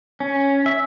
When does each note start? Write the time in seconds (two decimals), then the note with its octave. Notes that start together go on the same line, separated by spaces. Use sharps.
0.20 C#4
0.66 E5